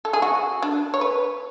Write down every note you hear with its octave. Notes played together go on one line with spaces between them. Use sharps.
A4
G#4
F#4
D4
C#5
B4